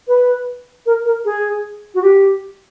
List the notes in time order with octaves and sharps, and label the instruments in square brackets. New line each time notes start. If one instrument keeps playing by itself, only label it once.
[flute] B4
A#4
A#4
G#4
F#4
G4